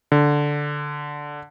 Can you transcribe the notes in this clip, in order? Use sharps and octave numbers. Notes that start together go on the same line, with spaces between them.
D3